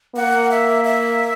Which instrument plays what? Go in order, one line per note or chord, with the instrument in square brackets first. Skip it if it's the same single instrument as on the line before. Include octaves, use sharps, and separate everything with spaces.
[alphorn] A#3 [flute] F#5
[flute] E5
E5